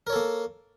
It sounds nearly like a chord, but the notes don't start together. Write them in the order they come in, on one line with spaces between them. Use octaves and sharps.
A#4 C#5 A4 A#3